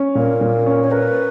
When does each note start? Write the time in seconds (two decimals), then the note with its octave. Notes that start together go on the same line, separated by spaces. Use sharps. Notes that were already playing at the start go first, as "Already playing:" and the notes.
Already playing: C#4
0.15 A#2 A#4
0.41 A#2
0.66 C#4
0.84 C#5
0.91 A#4 B4